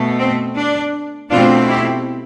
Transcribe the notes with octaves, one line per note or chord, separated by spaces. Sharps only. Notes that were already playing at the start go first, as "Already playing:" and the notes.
Already playing: B2 A3
C4
D4
B2 A3 C4 D4 F4
E4 G4